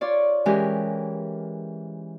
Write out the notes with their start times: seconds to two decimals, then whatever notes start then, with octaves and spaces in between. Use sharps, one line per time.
0.01 F4 C#5 D5
0.46 E3 G#3 C#4 G4 A#4